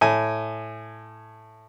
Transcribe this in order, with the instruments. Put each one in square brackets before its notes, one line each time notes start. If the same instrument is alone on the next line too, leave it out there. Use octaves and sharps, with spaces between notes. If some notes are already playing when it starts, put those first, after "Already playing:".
[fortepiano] A2 G#5